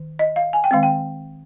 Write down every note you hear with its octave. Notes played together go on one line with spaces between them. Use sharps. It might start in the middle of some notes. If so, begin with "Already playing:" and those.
Already playing: D#3
D#5
F5
G#5
G5
D#3 G#3 C4 F5
G5